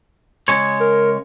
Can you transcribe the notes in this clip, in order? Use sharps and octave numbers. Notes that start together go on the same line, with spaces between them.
C#3 G#3 C#5
A#4